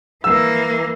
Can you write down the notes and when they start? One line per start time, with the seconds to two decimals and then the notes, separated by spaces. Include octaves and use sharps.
0.24 E3 A#3 E6